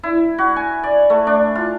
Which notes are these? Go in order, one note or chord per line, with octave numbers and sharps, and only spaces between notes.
E4
F#4
G#5
D5
A3
D4
F4